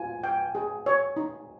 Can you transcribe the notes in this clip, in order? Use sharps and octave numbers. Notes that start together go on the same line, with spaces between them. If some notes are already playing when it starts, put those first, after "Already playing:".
Already playing: F4 G#5
G5
G#4
C#5
D#4